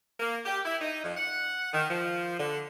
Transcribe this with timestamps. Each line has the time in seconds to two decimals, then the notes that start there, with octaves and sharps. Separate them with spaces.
0.20 A#3
0.45 G4
0.64 E4
0.80 D#4
1.04 F2
1.17 F#5
1.73 D#3
1.89 F3
2.39 D3